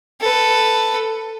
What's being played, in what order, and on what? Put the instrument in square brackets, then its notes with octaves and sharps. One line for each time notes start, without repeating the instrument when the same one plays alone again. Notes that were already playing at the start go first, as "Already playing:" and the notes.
[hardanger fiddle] A4 B4